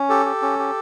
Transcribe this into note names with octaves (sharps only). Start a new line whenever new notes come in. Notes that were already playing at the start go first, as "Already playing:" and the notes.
Already playing: C#4
G4 A4
G4
C#4
G4